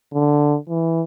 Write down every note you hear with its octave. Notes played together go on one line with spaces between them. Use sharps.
D3
E3